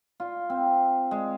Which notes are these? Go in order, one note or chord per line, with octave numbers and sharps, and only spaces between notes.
F4
C4
G#3